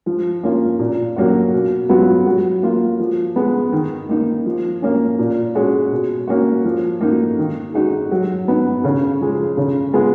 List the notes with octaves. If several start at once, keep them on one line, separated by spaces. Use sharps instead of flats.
F3
A#3 C#4 F4
A#2
F#3 A#3 C#4 F#4
B2
F#3 B3 F4
F#3
A#3 F4
F3
G#3 B3
D#3
A#3 D#4
F3
A#3 C#4
A#2
G#3 C#4 F#4
B2
A#3 C#4 F#4
F3
A#3 D#4 F#4
D#3
G#3 D#4 F#4
F#3
B3 D#4
C#3
F3 G#3
C#3
G#3 B3 F4